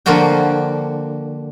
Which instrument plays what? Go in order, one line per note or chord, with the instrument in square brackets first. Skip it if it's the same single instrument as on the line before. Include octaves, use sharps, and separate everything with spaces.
[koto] D3 F3 A#3 F4 F#4 G5